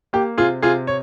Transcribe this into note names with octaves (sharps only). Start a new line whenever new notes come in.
A#3 G4
C3 F4 G#4
C3 F4 G#4
C#5